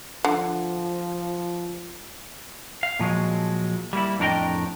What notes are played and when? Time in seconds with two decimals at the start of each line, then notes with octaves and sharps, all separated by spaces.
0.24 D3 F3
2.83 F5
2.99 A#2 F3 F#3 G#3
3.93 G3 A#3 E4
4.19 F2 A2 D4 A#4 D#5 G5